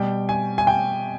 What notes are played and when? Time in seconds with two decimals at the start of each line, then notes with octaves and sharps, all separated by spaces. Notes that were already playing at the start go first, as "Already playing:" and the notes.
Already playing: B2 G3 G5
0.29 G#5
0.58 G#5
0.67 G5